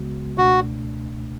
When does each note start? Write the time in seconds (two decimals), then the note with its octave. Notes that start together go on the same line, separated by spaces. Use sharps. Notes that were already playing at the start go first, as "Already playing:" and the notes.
Already playing: C#2 C#3 G#3 B3 F#4
0.38 C#2 B2 A3 D4 F#4